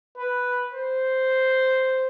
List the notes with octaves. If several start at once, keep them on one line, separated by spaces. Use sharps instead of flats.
B4
C5